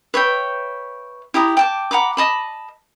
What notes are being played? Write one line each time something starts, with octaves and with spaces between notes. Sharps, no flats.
B4 C#5 E5 G5
E4 G4 A#5 D#6
G5 A5 D6
F#5 A#5 B5 D6
D#5 A5 B5